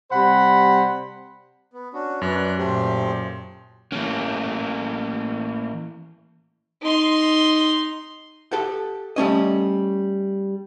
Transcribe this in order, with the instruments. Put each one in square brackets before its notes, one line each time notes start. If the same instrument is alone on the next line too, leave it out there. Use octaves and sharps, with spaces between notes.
[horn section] C3 G3 C5 F#5 B5
[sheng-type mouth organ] B3
C#4 D4 F#4
[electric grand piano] F#2 [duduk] B4 [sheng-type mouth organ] D5 A#5 F#6
[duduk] A#2 [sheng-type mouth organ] A3 G4 C5
[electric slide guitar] E3 C#4 [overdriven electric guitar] A3 A#3
[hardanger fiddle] D#4 C6
[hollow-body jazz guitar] G4 A4 F#5 G5
G3 A3 C#4 D#5